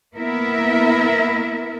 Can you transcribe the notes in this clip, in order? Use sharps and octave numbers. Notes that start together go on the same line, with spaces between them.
A#3 B3 E4 A#4 E5